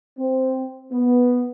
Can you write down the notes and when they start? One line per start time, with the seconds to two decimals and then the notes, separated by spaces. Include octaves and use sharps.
0.19 C4
0.92 B3